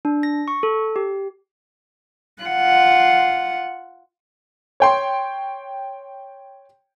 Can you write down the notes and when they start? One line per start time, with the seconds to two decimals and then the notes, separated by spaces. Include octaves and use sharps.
0.05 D4
0.23 A#6
0.48 C#6
0.63 A4
0.96 G4
2.42 F4 F#5
4.80 C#5 G5 C6